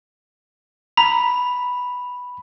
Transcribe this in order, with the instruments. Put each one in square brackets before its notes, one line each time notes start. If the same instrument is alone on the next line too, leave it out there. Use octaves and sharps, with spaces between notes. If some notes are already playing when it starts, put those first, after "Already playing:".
[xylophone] A#5 [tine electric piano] B5